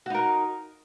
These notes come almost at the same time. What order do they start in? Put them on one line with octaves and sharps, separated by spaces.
F#4 D#4 A#4